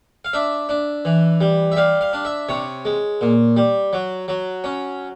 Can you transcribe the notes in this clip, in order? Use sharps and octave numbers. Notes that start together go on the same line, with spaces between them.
F5
D4 E5
D4
E3
G3
E5
G3 F5
F5
D4
E5
C3 C#5
G#3
A#2
G3
F#3
F#3
C#4